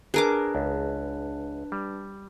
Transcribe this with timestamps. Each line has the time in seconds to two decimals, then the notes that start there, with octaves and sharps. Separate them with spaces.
0.14 D4 G#4 A#4 B4 D6
0.55 C#2
1.72 G3